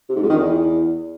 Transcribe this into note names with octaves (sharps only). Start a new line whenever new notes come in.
C3
G#2
F2
D#3
E2